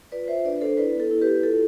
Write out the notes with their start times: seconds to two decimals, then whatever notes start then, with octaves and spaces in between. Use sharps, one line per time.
0.12 F4 B4 D5
0.28 F4 C5 E5
0.44 D4 B4 D5
0.61 D4 A4 C5
0.77 E4 B4 D5
0.95 B3
1.00 A4
1.11 E4
1.22 E4 G4 B4
1.43 F4 A4